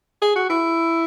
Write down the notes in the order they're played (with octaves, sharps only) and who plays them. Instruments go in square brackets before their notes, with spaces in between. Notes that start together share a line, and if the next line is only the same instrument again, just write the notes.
[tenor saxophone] G#4
F#4
E4